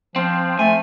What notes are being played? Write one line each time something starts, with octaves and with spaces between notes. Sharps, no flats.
F3 C4
A3 G#5